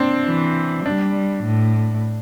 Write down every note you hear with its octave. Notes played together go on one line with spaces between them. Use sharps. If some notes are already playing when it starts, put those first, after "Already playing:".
Already playing: C4 D4
E3
G3 D4
A2